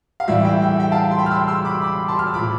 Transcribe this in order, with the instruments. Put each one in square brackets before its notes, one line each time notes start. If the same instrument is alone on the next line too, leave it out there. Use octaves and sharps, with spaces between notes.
[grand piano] F5
A2 E3 G3 E5
E5 G5
E5 G5
E5 G5
F5 A5
C6
G5 B5
F6
C6 E6
C6 E6
B5 D6
B5 D6
A5 C6
F6
E6
A2 F3 B5 D6